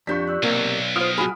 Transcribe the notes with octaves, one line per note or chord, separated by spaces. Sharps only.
F2 D4 F4 G4 D5 C#6 G6 B6
D5 E6 F#6
B1 C3 A#3
F4 C5 D#6 F6 D7
F4 F#4 G#4 B5